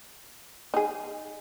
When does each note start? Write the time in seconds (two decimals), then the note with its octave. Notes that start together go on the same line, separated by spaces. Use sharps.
0.74 D#4 G#4